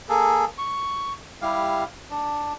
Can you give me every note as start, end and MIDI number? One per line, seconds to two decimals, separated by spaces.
0.09 0.45 58
0.09 0.45 68
0.09 0.45 69
0.58 1.13 85
1.42 1.84 55
1.42 1.84 64
1.42 1.84 67
1.42 1.84 77
2.11 2.53 62